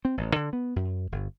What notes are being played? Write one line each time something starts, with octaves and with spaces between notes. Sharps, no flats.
C4
A1
D3
B3
F#2
G1